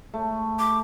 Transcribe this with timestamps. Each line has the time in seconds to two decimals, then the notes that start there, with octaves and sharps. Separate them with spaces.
0.14 A3
0.59 D6